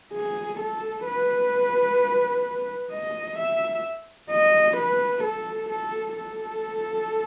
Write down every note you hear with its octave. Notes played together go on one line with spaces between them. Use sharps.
G#4
A4
B4
D#5
E5
D#5
B4
A4
A4
A4